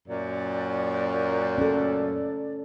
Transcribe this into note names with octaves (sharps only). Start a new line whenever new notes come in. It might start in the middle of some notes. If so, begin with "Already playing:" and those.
F#2 A#2 D5
C#4 A4